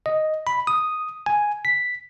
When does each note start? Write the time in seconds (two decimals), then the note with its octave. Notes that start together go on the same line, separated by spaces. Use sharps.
0.06 D#5
0.47 B5
0.67 D#6
1.26 G#5
1.65 B6